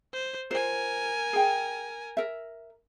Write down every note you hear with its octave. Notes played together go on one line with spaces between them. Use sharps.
C5
F4 A#4 C5 G#5
G#4 G5
A#4 E5